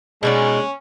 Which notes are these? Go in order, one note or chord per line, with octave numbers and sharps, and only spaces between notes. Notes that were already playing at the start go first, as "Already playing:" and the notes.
B2 G#3 C#4 D#4 D5